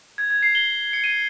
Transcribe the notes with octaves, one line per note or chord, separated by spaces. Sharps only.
G#6
G#6
C7
G7
C#7
D#7